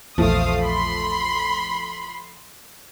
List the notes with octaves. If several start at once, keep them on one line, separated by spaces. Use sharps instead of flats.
A#1 E2 F3 A3 C5 F5 D#6
B5 C6